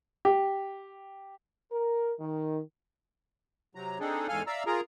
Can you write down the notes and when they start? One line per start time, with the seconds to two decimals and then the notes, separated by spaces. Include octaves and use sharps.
0.25 G4
1.72 A#4
2.20 D#3
3.75 C3 F#3 A#5
4.00 C4 D4 D#4 G#4 A4
4.28 E2 G#2 A4 F5 G#5 F6
4.47 D5 E5 F5 A#5 E6
4.66 F4 G#4 A#4 A#5